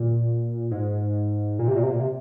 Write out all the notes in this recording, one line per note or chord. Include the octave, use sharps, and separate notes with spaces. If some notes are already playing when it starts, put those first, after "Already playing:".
Already playing: A#2
G#2
A#2
C3
A#2
C3
A#2
C3